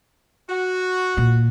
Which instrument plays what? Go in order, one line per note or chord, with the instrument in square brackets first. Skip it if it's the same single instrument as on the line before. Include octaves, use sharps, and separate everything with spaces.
[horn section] F#4
[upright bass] A#2